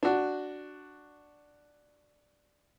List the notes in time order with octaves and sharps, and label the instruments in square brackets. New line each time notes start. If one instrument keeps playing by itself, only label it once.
[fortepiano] D4 F#4